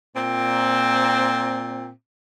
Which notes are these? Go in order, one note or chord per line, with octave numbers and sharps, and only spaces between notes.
A#2 C4